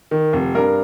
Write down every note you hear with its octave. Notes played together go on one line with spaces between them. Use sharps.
D#3
F1
G2 A#4